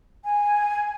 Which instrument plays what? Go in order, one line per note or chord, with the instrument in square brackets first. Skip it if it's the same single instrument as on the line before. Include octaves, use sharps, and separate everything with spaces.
[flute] G#5